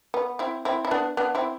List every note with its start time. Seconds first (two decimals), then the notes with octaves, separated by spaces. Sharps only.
0.14 B3
0.39 C4 E4
0.65 C4 E4
0.85 E4
0.91 B3 D4
1.17 B3 D4
1.35 C4 E4